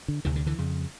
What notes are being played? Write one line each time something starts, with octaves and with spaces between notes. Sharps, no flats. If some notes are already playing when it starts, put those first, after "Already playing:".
D3
D2 C3 D#3
D3
D3 E3
F2 C#3